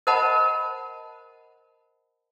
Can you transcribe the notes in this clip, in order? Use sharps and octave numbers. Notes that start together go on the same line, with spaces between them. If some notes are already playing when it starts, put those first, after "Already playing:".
A#4 C5 D#5 F#5 A5 B5